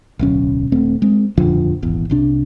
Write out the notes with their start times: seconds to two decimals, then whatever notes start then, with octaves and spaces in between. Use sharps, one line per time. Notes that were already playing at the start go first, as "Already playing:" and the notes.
0.19 D1 B1 C#4
0.72 D#1 A3 C4
1.02 G#3 C4
1.37 D#1 F2 D3 F3
1.82 D#1 G#1 E2
2.10 C2 C3 D4